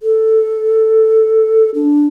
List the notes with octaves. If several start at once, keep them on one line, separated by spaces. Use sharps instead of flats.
A4
D4